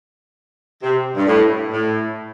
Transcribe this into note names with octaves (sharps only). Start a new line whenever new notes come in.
C3
G2
A2
A2